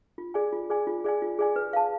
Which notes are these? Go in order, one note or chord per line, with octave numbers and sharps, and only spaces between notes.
F4
G#4 D5 G#5
F4
G#4 D5 G#5
F4
G#4 D5 G#5
F4
G#4 D5 G#5
B4
F5 A5